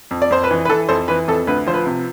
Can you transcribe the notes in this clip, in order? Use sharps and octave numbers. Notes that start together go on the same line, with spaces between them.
F2
D5
F2 C5
B4
E3
B4
E3 A4
F2 A4 C5
E3 B4
F2 A4
D2 B4
F3 C5
B4
C3